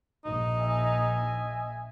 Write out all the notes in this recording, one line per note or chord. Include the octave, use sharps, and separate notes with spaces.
A#1 D#4
D#5 E5 G#5